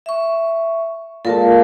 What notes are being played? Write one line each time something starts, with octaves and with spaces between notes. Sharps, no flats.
E5 C#6
A#2 G#3 A4 A#4 A5